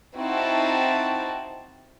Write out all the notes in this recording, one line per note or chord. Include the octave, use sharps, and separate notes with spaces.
C4 D#4 E4 F#4 A5